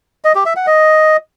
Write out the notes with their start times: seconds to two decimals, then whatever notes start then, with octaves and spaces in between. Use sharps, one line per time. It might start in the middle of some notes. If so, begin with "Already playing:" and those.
0.24 D#5
0.35 G4
0.46 E5
0.56 F#5
0.67 D#5